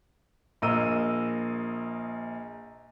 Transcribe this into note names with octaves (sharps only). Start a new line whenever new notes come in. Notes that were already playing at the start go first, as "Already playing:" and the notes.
A#1 A#3 D#5 E6 D#7